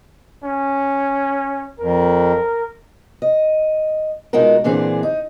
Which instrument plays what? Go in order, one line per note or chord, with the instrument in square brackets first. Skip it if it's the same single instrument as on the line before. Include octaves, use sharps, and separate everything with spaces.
[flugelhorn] C#4
[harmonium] F2 [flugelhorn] A#4
[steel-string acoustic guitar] D#5
B2 G#3 D#4 F4 F#4 A#4
A#2 D3 E3 C4 D4 G#4
D#4